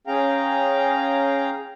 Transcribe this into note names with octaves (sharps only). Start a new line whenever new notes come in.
C#4 G#4 F5 G5 A#5